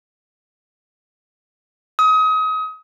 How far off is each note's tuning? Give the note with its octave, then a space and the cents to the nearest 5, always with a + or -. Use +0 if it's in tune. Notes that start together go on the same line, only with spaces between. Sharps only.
D#6 +30